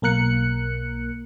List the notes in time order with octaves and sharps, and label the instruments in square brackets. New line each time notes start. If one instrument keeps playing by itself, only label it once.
[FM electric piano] B1 A#3 A#4 F#6 C#7